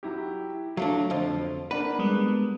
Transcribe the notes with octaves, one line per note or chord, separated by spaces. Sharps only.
F#3 E4 G4
F#3 A3 D4 F5
F2 D3 F3
A#3 D4 B4 F#5
G3 G#3 B3